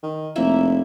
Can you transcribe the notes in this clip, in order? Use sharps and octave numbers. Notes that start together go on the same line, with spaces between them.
D#3
F1 A#3 E4 E5